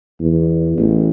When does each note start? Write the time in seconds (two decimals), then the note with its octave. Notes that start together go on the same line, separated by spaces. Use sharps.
0.20 E2
0.78 A1